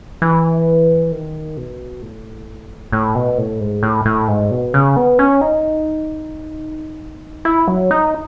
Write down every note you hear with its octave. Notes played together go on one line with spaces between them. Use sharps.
E3
D#3
B2
A2
A2
B2
A2
G#2
A2
A2
G#2
B2
C#3
B3
C#4
D#4
E4
F#3
D#4